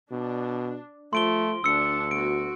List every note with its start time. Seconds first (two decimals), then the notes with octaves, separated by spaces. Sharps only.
0.11 B2 D4
1.13 F3 A3 C6 D7 G7
1.64 D2 D4 E6 C#7
2.11 B3 F#4 D7